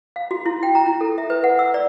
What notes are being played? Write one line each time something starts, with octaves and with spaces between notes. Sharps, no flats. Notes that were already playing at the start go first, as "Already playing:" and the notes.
F5
F#4
E4
G5
A#5
E4
A4
E5
B4
F#5
E6
D5